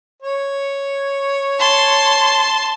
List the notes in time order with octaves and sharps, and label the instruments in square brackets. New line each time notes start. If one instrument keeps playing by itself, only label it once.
[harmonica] C#5
[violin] A5 C6